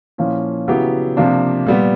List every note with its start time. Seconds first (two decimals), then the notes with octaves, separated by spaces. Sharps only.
0.18 A#2 F3 A#3 C#4 E4
0.68 C#3 F#3 B3 E4 G4
1.17 C3 F3 A#3 D4
1.66 A#2 G3 B3